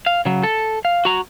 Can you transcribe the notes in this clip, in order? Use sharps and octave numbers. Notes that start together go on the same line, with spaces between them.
F5
C#3 F#3
A4
F5
F#4 A#5